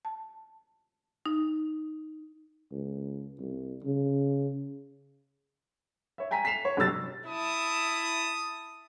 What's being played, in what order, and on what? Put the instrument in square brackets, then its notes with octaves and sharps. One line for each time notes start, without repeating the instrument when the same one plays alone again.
[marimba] A5
D#4
[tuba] C#2
C2
C#3
[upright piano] C#5 E5
G5 G#5 A#5 B6
B6 C7 E7 F7
C#5
G1 C3 F#3 E6 A6
[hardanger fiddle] E4 A5 [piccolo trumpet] D#6